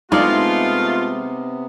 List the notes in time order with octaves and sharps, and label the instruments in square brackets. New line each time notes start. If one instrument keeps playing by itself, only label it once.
[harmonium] C3 B3 [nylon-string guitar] G#3 [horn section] A3 F4 [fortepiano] D#4 D5 F5